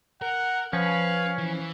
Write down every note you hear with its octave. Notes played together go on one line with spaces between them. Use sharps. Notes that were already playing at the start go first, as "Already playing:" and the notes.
A#4 F#5
F3 C#4 B4 F5
E3